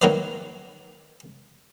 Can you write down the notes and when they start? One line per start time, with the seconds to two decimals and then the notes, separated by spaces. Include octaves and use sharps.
0.02 D#3 F#3 A#3 A#4 B4 D5